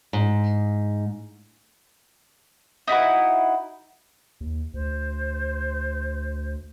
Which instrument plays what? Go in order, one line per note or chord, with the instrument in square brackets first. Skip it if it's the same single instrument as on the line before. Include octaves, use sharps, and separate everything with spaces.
[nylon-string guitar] G#2
[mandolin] D#4 E4 F#4 B4
[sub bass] D#2
[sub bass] D2 [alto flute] C5